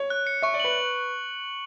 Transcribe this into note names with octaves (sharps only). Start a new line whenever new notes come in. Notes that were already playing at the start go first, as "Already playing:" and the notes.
Already playing: C#5
F#6
C#7
E5 C#6
D5
B4 F#7